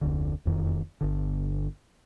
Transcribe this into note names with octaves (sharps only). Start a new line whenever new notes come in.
F1 D2 D3
E1 F2 D#3
G1 D3